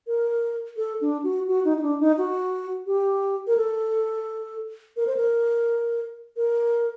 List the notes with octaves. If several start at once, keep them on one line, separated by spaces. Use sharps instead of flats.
A#4
A4
D4
F#4
F#4
D#4
D#4
D4
D#4
F#4
G4
A#4
A4
A#4
C5
A#4
A#4